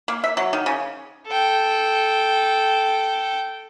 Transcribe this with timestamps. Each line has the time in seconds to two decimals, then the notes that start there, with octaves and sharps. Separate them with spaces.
0.08 A#3
0.24 E5
0.37 F#3
0.53 D#3
0.66 C#3
1.27 A4 G5